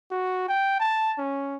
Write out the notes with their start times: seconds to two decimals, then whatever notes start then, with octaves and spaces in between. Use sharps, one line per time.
0.11 F#4
0.48 G5
0.80 A5
1.18 C#4